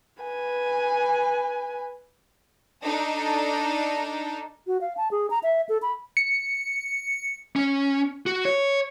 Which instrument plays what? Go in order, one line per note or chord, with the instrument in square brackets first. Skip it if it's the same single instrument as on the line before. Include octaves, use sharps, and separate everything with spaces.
[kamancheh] B4 G#5
[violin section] D4 D#4 A4
[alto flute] F#4
F5
A5
G#4
A#5
E5
A4
B5
[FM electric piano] C#7
[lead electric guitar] C#4
F#4
C#5